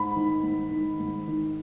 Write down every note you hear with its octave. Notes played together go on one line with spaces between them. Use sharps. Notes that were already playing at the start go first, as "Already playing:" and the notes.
Already playing: G#2 B5
D#3
G#2
D#3
G#2
D#3